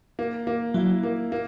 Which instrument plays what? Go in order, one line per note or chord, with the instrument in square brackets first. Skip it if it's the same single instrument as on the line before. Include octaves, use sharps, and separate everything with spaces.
[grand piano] A#3
A#3
[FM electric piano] F#3 [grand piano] E4
[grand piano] A#3
A#3